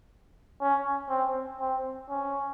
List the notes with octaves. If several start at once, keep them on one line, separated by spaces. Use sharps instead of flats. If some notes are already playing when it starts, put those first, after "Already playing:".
C#4
C4
C4
C#4